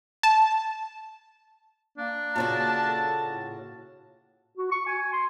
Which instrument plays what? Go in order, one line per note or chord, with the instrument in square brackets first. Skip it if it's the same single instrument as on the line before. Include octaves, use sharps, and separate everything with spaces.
[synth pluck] A5
[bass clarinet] A#3 [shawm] D4
[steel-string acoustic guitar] A#2 C#3 F#4 [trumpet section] A5
[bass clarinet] A4
A2
[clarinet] F#4
C#6
G#5
C6